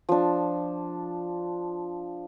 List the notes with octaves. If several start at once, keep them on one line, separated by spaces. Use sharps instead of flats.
F3 D4